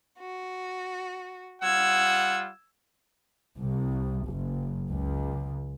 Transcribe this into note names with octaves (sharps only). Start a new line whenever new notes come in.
F#4
G3 F4 F#5 E6 G#6
C2
F#1
C#2